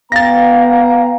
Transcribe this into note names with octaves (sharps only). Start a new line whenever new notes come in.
B3 F5 G5 A#5 A6 A#6